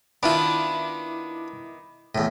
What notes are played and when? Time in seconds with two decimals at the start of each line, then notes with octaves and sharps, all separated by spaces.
0.23 D#3 B3 D4 E4 F4 B5 D6
2.15 E2 A2